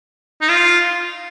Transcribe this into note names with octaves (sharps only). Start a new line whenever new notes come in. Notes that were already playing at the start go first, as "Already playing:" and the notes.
D#4
F4